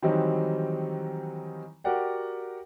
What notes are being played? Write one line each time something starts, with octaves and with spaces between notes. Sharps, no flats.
D#3 E3 F#3 G3 C4 D#4
F#4 G4 A#4 D5 F#5 G5